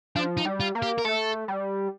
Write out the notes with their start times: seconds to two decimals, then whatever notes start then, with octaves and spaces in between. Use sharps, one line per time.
0.15 F3 D4
0.37 D#4
0.45 G3
0.60 F4
0.75 A#3
0.82 G4
0.98 A#4
1.05 A3 A4
1.48 G3